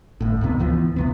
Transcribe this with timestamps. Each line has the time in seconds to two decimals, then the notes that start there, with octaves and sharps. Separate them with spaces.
0.21 G1 A2
0.41 D2 G#2 C3 B3
0.59 D2 E3 F3 B3
0.96 D1 C3 B3